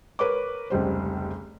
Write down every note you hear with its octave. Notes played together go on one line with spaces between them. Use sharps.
A#4 B4 C#5 D6
F1 C#2 G3 C5